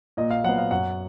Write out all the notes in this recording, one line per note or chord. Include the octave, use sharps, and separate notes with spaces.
A#2 D#5
F5
F#3 B3 F#5
F5
F#2 F#5